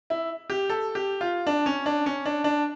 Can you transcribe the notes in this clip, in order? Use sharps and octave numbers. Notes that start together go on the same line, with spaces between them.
E4
G4
A4
G4
F4
D4
C#4
D4
C#4
D4
D4